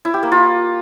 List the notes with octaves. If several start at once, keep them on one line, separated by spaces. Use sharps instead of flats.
E4
G4
A#3
F4